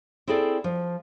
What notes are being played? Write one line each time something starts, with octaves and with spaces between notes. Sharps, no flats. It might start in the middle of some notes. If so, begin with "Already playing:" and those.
C4 E4 G#4 A4 D5
F3